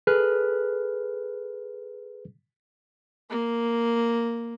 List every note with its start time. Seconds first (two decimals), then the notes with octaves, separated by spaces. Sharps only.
0.07 G#4 A4 B4 F6 F#6
3.30 A#3